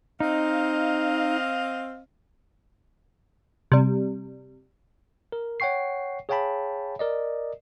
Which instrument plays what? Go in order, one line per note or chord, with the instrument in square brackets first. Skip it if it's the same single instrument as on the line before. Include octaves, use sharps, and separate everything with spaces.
[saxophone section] C4 D#5 F5 [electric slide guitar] D#4
[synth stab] C3 G3
[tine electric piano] A#4
C#5 F#5 G5 C#6 C7
G#4 C#5 F5 G5 A5 B5
A#4 D5 D#5